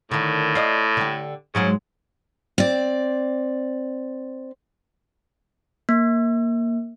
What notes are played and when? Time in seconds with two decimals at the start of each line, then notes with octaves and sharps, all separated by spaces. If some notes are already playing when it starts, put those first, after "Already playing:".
0.11 A2 D3 D#3
0.55 F4 D5 D#5
0.97 D3 G4
1.55 G#2 C#3 F#3 G#3
2.58 C4 D5
5.89 A#3